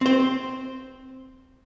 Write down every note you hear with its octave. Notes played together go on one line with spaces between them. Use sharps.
C4 C5